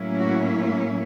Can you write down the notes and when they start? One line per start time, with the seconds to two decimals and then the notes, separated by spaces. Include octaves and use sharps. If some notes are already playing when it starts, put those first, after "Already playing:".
Already playing: A2 F#3 A#3 C#4 E4
0.20 F#4